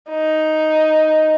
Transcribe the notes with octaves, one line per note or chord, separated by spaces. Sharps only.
D#4